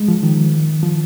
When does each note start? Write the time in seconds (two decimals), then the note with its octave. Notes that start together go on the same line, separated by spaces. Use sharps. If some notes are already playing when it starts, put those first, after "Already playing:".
Already playing: G#3
0.08 F3
0.23 D#3
0.83 F3